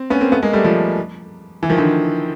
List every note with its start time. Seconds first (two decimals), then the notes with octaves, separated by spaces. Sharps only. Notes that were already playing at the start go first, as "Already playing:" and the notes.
Already playing: C4
0.10 B3 C#4
0.21 A#3 C4
0.32 A3 B3
0.43 G#3 A#3
0.53 G3 A3
0.64 F3 G3
1.63 E3
1.70 D#3 F3
1.78 D3 E3